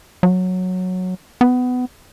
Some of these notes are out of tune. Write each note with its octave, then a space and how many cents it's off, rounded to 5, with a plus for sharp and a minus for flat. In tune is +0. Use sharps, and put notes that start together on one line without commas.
F#3 -10
B3 +20